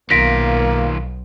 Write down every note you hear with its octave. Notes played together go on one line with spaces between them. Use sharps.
B1 D#3 A#3 F4 A#6 B6 D7